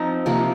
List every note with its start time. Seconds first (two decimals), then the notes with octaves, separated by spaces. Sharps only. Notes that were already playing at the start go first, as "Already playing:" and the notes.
Already playing: F3 C4 D#4
0.26 C3 F3 A#3